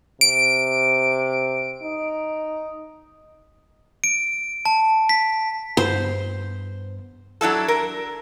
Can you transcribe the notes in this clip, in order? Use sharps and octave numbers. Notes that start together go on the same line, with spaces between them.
C3 D7
D#4
D7
A5
B6
G2 B3 C5
F#3 D4 E4 A4
A#4